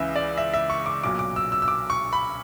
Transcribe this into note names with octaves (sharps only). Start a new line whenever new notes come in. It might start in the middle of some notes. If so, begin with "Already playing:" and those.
Already playing: C#2 C#3 E3 E5
D5
E5
E5
C#6
D6
B1 A#2 F#3 D6
D6
E6
E6
E6
D6
C#6
B5